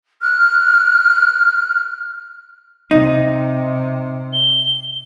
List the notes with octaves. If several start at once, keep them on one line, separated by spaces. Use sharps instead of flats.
F6 F#6
C3 D#4
G7